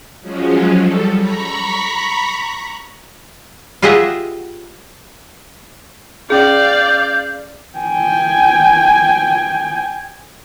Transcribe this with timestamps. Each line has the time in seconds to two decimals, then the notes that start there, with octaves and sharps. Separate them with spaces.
0.21 F3 F#3 G#3 C#4
0.75 G3 A4
1.17 A#5 B5 C#6 B6
3.82 F4 G4 G#4 D#5 E5 F#5
6.30 C#4 G#4 D5 F5 G6
7.79 G5 G#5